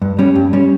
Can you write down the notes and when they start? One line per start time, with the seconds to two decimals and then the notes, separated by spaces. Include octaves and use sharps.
0.02 G2
0.19 G3 C#4
0.35 G2
0.53 G3 C#4